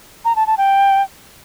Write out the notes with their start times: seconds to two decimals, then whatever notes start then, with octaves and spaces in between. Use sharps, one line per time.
0.25 A#5
0.36 A5
0.47 A5
0.58 G5